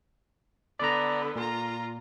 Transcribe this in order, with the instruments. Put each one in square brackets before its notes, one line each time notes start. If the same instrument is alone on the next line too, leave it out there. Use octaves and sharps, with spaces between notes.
[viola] D3 B3 [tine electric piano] D5 A#5
[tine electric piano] A#2 [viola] F4 A#5